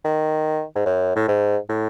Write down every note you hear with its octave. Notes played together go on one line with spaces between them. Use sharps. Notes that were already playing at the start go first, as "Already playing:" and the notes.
D#3
G#2
F#2
A2
G#2
A2